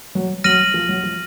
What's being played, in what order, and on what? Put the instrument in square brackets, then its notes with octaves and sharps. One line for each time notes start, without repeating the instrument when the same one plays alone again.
[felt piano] F#3
[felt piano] F#3 [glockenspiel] F6 A#6 D#7 F#7
[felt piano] F3
F#3
F3